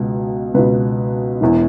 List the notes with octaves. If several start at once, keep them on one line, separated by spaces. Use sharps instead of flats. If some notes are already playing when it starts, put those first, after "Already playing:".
Already playing: C#2 B2
C#2 B2 B4
E1 E2 E3